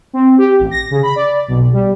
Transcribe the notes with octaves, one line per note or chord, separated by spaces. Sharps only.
C4
G4
A1
A#6
C#3
B5
D5
B1
G3